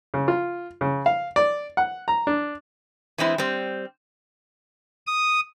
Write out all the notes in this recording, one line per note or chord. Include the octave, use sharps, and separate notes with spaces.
C#3
F4
C#3
F5
D5
F#5
A#5
D4
E3 G#3 C4 E4
G3 C4
D#6